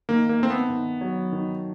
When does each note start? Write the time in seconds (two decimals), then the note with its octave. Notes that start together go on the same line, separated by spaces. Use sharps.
0.09 D#3 A#3
0.29 A#3
0.40 A3 C4
0.50 B3
0.70 D#3
1.01 F#3
1.32 D#3